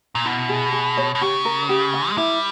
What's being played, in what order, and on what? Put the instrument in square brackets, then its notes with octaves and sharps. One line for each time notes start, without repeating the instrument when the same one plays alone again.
[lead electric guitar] A#2
[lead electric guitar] B2 [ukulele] E4
[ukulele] G#4
G#4
C#5
[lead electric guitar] B2
[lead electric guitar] C#3 [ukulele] G4
[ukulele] A#4
G4
G#5
[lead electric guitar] G#3
[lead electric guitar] G3 [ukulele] E4